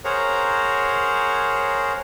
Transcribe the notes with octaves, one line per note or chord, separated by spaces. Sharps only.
G#4 A#4 C5 C#5 F#5 A#5